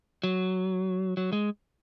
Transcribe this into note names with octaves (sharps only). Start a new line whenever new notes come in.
F#3
F#3
G#3